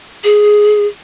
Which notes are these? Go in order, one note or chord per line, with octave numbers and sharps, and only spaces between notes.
G#4